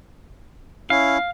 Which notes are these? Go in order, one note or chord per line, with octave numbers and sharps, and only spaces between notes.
C#4 E4 F5